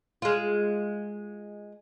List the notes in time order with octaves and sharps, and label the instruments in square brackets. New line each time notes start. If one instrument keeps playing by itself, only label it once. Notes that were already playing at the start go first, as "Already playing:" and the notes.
[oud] G#3 F4